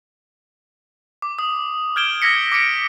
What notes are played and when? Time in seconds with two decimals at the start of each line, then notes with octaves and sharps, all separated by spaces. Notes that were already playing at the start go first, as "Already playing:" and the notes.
1.22 D6
1.39 D#6
1.96 F6 G6 G#6 D7 E7 G7
2.22 E6 G#6 A#6 B6 C#7
2.52 D6 B6 C#7 D7